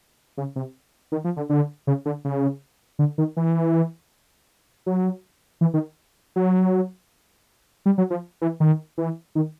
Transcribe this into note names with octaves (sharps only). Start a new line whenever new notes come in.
C#3
C3
D#3
F3
D3
D3
C#3
D3
C#3
D3
D#3
E3
F#3
E3
D#3
F#3
G3
F#3
F3
E3
D#3
E3
D#3